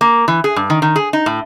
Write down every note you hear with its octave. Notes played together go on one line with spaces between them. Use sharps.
A#3
E3
G#4
G2
D#3
D#3
G#4
D#4
A2